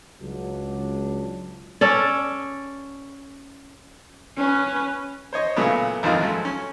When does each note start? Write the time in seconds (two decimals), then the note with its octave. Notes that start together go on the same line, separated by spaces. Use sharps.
0.21 C#2 F#3 D4
1.81 C#4 A4 D5
4.37 C#4 B4
5.33 C5 C#5 D#5
5.56 A#2 C#3 F#3 A3 B3
6.03 G#1 F2 D#3 F4
6.21 F3 F#3 G#3 A3 C#4
6.45 C#4